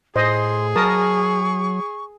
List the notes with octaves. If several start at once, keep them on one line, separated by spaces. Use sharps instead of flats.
A2 G#4 C5 D#5 C6
F#3 A#4 A5 C#6 D#6